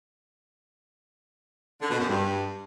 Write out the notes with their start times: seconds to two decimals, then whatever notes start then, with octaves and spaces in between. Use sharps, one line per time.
1.81 D3
1.90 B2
2.00 F#2
2.09 G2